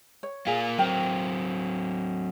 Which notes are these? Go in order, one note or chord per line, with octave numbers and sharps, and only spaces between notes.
C#5
A#3 F4 G#4 G#5
F#3 C4 A#4 G5